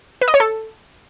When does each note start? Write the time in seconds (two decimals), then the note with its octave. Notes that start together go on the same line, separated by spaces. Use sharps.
0.21 B4
0.28 D#5
0.34 C#5
0.40 A4